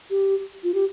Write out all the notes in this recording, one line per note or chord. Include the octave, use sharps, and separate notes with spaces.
G4
F4
G4